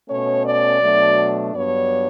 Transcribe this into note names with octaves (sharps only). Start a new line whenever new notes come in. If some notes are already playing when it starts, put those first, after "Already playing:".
B2 A3 C#4 C#5
D5
B2 F#3 A3 D4
G2 F#3 B3 D4 C#5